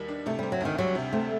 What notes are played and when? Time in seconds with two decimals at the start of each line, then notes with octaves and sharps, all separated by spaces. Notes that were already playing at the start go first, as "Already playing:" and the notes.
Already playing: D#2 D#3 G3
0.08 D4
0.26 C3 A3
0.39 G3 C4
0.52 F#3
0.61 D2 D#3
0.78 F#3 G3
0.95 C3
1.13 A3 C4